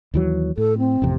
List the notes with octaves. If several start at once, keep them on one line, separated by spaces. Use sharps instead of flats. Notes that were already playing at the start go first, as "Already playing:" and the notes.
D#2 E3 F#3
A2 A4
C4
A1 F2 C3